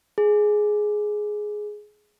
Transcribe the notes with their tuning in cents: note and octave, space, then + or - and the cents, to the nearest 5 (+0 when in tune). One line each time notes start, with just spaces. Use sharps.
G#4 +10